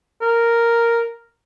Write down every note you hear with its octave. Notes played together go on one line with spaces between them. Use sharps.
A#4